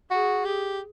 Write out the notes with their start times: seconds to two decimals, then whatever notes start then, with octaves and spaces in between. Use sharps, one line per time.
0.11 F#4 G#4
0.45 G4